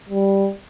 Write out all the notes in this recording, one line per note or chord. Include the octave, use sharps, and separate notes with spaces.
G3